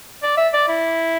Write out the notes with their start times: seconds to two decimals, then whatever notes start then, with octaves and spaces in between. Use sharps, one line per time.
0.23 D5
0.37 E5
0.54 D5
0.69 E4